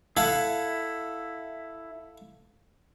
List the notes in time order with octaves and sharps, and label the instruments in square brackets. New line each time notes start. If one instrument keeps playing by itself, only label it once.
[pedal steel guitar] E4 [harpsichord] A4 F5 F#5